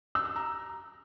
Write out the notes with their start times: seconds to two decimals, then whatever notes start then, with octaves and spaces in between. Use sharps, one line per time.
0.15 E6
0.25 E6
0.36 A#5